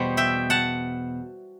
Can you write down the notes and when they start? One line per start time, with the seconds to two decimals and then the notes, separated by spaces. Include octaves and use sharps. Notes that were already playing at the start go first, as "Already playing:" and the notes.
Already playing: E2 B2 G3 B3 C5
0.17 E5 G5
0.50 F#5 A5